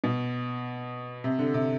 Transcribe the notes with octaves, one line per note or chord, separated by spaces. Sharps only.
B2
C3
D3
C3